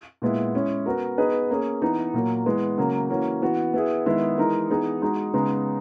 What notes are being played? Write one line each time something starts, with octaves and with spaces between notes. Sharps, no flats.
A#2 G#3 B3 E4
G#3 C#4 E4
B3 F#4 A#4
B3 D#4 G#4 B4 D#5
A#3 C#4 G#4
E3 B3 D#4
A#2 F#3 A#3
E3 G#3 B3
C#3 F#3 A#3
E3 A#3 C#4 F#4
E3 B3 F#4
B3 E4 G#4
D#3 G#3 B3 E4 G#4
E3 G#3 D#4 A#4
E3 B3 D#4 G#4
G#3 D#4 F#4
C#3 G#3 B3 D#4